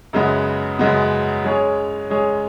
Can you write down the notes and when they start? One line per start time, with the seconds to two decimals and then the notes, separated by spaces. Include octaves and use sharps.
0.13 F#2 C#3 G#3 B3
0.79 F#2 C#3 G#3 B3
1.44 G#3 C#4 G#4 C#5
2.10 G#3 C#4 G#4 C#5